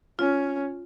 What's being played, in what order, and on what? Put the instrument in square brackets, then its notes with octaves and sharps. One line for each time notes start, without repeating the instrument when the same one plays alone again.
[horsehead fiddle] C#4 [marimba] F4